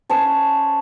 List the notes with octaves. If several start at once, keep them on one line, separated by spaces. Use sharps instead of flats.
C#4 C5 G#5 A5